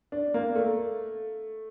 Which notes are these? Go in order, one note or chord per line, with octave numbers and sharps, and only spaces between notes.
D4
A#3
A3